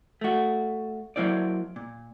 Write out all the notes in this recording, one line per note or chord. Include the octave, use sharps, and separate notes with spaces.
A3 F#4
F#3 A#3 E4 C5 D5
A#2